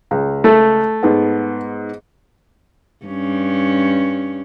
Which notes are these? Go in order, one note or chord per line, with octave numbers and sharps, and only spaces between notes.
C#2
A3
G#2 B3
G2 C#4